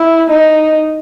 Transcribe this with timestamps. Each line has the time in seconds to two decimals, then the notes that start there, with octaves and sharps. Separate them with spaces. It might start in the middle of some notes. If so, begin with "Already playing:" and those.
Already playing: E4
0.30 D#4